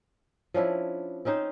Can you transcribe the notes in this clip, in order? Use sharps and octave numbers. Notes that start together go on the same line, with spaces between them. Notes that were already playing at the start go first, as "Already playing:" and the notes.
F3 C#4 D4 E4
C4 C#4 D#4 C5